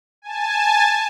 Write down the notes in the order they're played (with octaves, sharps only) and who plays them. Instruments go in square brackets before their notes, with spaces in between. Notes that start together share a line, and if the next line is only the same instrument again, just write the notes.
[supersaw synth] G#5 A5